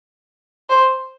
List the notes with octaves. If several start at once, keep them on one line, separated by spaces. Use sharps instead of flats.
C5